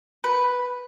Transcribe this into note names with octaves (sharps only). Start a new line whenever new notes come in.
B4